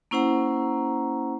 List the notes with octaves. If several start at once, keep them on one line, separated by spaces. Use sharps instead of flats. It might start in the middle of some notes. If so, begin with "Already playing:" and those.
A#3 C#4 E4 C5 F#5 A#5